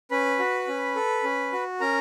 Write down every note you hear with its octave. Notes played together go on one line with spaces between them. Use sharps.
C#4 B4 B5
F#4
C#4
A4
C#4
F#4
C#4 A#4 A#5